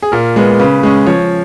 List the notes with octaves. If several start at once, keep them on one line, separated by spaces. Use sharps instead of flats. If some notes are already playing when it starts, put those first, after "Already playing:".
G#4
A#2 A#4
G#3 B3
C#3 B4
G#3 C#4
F3 C#5